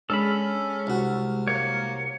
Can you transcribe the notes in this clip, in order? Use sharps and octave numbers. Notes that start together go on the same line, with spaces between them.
G#3 C#4 D4 A4 B5 F6
C2 F#4
A#3 C#5